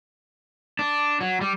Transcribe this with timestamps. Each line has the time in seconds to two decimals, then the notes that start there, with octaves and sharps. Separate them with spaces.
0.79 D4
1.21 F#3
1.41 G3